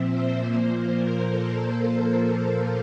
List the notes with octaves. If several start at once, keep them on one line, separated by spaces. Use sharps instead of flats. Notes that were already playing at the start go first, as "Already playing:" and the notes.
Already playing: A#2 F3 C4 E5
C5
A#2 F3 A#3
A#4
A4